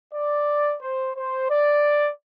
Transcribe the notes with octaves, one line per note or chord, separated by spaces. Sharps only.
D5
C5
C5
D5